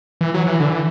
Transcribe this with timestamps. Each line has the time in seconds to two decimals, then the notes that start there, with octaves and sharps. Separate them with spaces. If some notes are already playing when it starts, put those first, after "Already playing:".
0.21 E3
0.34 F#3
0.47 E3
0.60 D3
0.70 E3